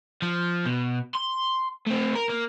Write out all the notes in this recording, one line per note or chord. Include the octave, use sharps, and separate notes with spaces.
F3
B2
C6
A3 C4
A#4
A#3